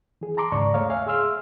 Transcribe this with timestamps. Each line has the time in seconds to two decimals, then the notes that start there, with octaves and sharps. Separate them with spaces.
0.21 E3 G#4
0.37 A5 A#5 C6 D6
0.52 D#2 G#2 C#3 D5 A#5 C#6
0.74 A3 C#5 F5
0.90 E5 F5 G#5
1.07 G#4 E5 C6 E6 F6